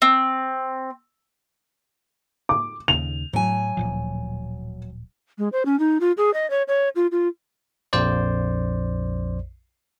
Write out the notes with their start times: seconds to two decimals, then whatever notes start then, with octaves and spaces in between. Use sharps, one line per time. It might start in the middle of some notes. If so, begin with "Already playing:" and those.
0.02 C4
2.49 D6
2.88 D#2 C#3 F7
3.33 A2 F#3 G#5
3.77 D1 A#2 F3
5.38 G#3
5.52 C5
5.65 C#4
5.79 D#4
6.00 F4
6.17 G#4
6.34 D#5
6.50 C#5
6.68 C#5
6.96 F4
7.12 F4
7.93 A#1 F2 C5 D5